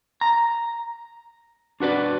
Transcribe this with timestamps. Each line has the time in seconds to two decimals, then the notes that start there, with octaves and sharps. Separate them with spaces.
0.21 A#5
1.80 D4 F#4 B4 D5